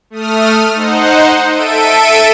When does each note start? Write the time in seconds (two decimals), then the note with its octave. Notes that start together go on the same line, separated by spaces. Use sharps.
0.10 A3 D#6 F6
0.75 D#4 C5 F#5
1.50 A4 E5 D7 D#7